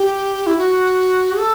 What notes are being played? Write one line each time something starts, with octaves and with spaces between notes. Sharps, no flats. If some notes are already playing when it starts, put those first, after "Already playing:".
Already playing: G4
E4
F#4
A4